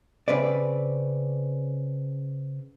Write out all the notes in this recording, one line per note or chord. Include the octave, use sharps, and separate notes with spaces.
C#3 C4 B4 D5